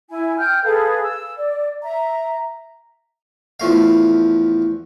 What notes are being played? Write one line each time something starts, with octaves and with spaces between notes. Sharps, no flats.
E4 G#5
G5 F6 G6
G#4 A4 B4 F5
E6
D5
E5 A#5
E2 F3 A3 F5